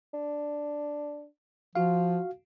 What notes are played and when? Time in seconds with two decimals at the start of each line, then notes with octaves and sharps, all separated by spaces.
0.13 D4
1.75 F3 F4 F#4 F5